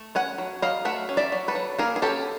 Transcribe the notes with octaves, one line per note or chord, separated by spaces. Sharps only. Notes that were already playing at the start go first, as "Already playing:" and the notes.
Already playing: A3
C#4 F#5 G#5
F#3
F#3 D#5 F5
A3 E5 F#5
C#4
D5 E5
F#3
A4 B4
F#3
A#3 G#4 A#4
G#4
C#4 G4 A4